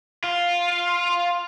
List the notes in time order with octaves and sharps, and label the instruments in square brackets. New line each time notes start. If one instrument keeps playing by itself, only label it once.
[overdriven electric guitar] F4